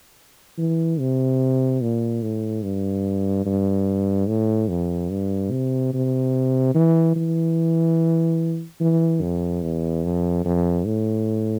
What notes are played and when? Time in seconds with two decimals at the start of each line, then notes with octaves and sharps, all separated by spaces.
0.58 E3
1.00 C3
1.82 A#2
2.22 A2
2.63 G2
3.45 G2
4.28 A2
4.69 F2
5.10 G2
5.51 C3
5.93 C3
6.75 E3
7.16 E3
8.80 E3
9.22 F2
9.62 E2
10.05 F2
10.45 F2
10.86 A2